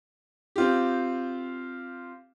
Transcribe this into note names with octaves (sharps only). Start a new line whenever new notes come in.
C4 F4 G4